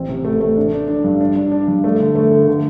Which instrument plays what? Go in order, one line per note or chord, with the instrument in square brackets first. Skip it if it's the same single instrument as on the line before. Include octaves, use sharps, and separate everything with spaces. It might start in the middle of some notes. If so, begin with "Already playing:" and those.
Already playing: [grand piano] A1 C4
C3
A3
A3
D4
D4
D4
G2
D4
D4
D4
G2
A3
D3
A3
D3
D3